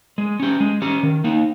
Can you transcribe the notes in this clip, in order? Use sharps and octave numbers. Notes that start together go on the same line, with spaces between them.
G#3
C#4 G4
G#3
C#4 G4
D#3
A#3 D#4